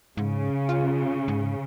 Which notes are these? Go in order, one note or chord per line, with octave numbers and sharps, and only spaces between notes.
G#2 C#3
F4
G#2